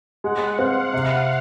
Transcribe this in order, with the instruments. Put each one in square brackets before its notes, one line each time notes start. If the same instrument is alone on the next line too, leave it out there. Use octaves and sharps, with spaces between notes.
[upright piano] G#3 [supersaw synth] F#5
[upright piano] C4 [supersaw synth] F5
[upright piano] C3